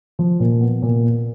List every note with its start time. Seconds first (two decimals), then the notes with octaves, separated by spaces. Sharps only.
0.19 F3
0.40 A#2
0.61 B3
0.82 A#2
1.03 A#3